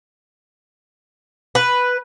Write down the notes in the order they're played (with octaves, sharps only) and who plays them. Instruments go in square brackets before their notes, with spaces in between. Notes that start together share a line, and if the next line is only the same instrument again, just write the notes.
[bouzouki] B4